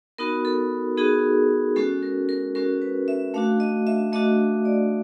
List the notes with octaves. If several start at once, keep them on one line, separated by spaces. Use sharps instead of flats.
B3 D#4 F#4 A#4
A4
B3 D#4 F#4 G#4
G#3 C#4 F#4 A4
A#4
A#4
G#3 C#4 F#4 A#4
B4
E5
A3 D4 F#4 F5
D#5
E5
A3 D4 F#4 D#5
D5